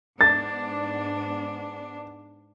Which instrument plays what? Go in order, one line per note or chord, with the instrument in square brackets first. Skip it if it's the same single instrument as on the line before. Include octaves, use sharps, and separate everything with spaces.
[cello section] G#2 B3 D4 [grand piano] A6